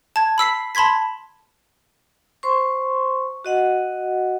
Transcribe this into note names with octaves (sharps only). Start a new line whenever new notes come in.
A5 G#6
B5 E6 B6 C7
A5 B5 C6 G#6 B6
C5 C6 C#6
F#4 D#5 F#5